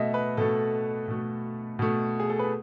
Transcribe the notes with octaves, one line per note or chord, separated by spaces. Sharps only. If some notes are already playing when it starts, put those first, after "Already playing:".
Already playing: B2 A3 D#5 E5
B4
B2 A3 A4
B2 A3
B2 A3
G#4
A4
B4